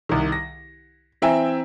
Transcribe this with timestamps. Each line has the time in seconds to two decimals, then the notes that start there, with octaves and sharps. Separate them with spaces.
0.09 C2 D#3
0.32 A#6
1.22 E3 C4 E5 G5 G#5 A#5